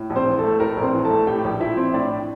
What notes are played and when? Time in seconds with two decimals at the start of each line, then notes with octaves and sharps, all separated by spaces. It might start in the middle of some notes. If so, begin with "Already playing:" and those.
Already playing: A2
0.10 A#1
0.15 C4 C5
0.26 E3
0.39 A4
0.44 A3
0.60 A2 A#4
0.77 A#1
0.82 C4 C5
0.93 E3
1.05 A4 A5
1.10 A3
1.27 A2 G4 G5
1.44 A#1
1.61 F3 E4 E5
1.77 C4
1.94 A2 D4 D5